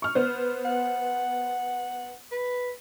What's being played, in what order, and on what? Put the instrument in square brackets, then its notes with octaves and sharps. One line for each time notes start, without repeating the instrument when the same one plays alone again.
[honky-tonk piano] C#6 F6
B3 C5
[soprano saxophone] F#5
B4